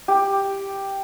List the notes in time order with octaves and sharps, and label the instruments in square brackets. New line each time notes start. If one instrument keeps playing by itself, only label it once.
[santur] G4